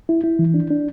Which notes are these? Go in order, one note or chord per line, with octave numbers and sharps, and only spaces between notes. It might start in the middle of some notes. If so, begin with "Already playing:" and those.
E4
E4
E3
D4
D4